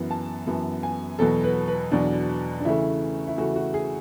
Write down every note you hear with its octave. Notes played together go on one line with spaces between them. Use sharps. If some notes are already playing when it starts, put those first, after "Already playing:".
Already playing: F#2 E3 B3
A5
F#2 E3 B3
G#5
E2 B2 F#3 B3 A4
B4
B4
E2 B2 F#3 B3 D4
D4
C#3 E3 A3 E4
E4
C#3 E3 A3 F#4
F#4
G#4